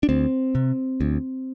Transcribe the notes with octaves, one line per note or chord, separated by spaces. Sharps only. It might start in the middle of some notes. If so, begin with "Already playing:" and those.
D4
D2 C4
C3
D2